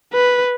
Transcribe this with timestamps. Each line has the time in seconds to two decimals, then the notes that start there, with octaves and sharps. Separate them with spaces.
0.13 B4